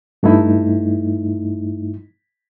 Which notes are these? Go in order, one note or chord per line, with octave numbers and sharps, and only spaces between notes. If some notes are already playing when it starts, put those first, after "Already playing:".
G2 A3 D#4 E4